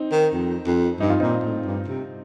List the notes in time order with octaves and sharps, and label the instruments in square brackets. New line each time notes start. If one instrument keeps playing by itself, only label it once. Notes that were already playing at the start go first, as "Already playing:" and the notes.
Already playing: [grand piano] C4 D#4
[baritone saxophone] D#3
F2
F2
[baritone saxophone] G2 [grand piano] D#4
[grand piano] F4
[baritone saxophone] A#2 [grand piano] C4 D#4
[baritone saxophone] A2
G2
C3